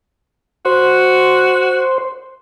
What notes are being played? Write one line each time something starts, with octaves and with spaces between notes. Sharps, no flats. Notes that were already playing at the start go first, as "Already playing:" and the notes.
F#4 C5